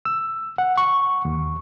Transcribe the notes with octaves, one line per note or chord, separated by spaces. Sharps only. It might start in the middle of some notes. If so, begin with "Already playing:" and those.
E6
F#5
C#6
D#2